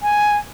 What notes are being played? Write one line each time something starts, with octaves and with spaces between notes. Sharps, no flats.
G#5